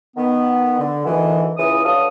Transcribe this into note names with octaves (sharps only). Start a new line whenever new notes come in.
D#3 B3
D3
D2 B2 D#3 E3
C#2 E3 D#6
G2 F#3 A4 F5 D#6